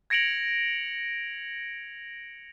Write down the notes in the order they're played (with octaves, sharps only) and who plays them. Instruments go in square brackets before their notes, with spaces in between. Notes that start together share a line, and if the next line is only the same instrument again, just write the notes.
[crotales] G#6 A#6 C#7 D7 F7 F#7